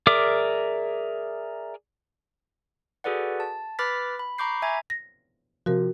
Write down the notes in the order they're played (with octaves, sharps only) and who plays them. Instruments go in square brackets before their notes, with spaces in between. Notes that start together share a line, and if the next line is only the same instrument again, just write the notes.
[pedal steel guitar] G#4 A#4 D5 E5 D6
[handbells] F#4 G#4 A4 B4 D5 F#5
A5
B4 B5 D6 F6 A6 B6
B5
A#5 B5 C#6 D6 G6 C7
E5 G#5 A#5 G#6
[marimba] A#6
[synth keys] C3 F3 [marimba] F#4 A#4